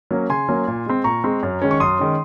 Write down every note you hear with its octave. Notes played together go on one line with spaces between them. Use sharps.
F#3 A#3 C#4
C#3 G#5 C6
F#3 A#3 C#4
A#2
G#3 C4
A#2 A#5 C#6
G#3 C4
F#2
D#3 G#3 C#4
C#6
F#2 C6 D#6
D#3 G#3 C#4